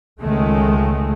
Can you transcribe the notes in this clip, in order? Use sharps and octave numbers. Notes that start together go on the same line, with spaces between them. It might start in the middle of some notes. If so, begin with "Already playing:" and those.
C#2 D#3 G#3 A3